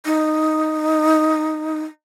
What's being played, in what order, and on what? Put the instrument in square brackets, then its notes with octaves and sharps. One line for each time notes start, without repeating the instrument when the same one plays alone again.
[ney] D#4